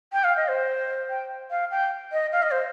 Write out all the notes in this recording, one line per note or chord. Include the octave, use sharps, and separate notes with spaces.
G5
F5
D#5
C5
G5
F5
G5
D#5
F5
D#5
C5